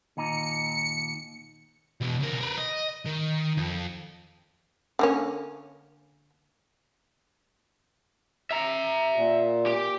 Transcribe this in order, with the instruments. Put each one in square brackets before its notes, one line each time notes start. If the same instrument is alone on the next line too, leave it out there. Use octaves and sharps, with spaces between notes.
[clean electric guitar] D#2 A#2 D#4 [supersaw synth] C#7
[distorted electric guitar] B2 E3
C#2 A#4
A#4 B4
D#5
D#3
F2
[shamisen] D3 A#3 C#4
[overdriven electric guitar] E5 A#5
[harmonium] A#2
[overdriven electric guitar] G4